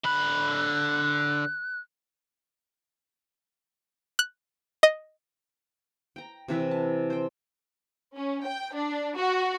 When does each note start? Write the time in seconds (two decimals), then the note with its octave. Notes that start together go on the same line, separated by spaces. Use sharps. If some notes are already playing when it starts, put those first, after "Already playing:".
0.05 D3 B5 F#6
4.19 F#6
4.83 D#5
6.16 G5 A#5
6.48 C3 E3 B4 E5
6.71 A5
7.10 C5 G5
8.16 C#4
8.44 G5
8.75 D4
9.17 F#4